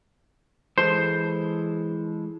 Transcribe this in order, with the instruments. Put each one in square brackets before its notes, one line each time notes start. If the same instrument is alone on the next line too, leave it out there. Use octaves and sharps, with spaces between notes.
[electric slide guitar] E3 G#3 A4 [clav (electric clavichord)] C5